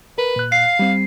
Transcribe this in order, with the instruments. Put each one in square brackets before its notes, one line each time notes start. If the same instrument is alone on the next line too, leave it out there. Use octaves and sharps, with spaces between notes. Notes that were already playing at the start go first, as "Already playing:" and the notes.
[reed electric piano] A#4 [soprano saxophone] B4
[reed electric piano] A#2 F#6
[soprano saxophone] F5 [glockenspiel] C7
[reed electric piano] G3 C4